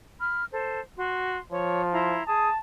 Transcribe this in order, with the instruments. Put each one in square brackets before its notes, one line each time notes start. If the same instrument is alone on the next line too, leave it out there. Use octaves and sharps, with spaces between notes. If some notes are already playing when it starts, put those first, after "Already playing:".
[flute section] B5 F6
A4 C5
F#4 C6
[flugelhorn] F3 [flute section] C#5
[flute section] E4 A#5 C6
[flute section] G#4 D#6 [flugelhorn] A5